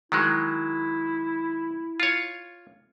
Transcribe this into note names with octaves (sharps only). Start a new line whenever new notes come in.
D#3 F#3 G#3 E4
F4 C#5